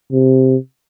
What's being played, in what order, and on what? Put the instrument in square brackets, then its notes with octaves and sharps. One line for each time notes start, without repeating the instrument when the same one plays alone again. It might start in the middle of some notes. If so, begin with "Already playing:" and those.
[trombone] C3